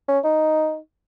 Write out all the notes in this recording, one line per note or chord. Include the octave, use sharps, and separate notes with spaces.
C#4
D#4